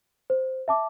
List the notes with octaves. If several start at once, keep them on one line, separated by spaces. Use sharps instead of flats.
C5
E5 A5 D6